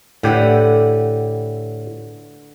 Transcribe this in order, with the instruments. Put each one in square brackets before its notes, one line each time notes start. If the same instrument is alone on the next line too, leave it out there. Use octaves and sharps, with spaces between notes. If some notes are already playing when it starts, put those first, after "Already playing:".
[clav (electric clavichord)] A2 G4 [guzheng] D3 B4 F#5